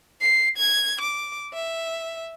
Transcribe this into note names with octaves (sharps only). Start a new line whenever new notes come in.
C7
G#6
D6
E5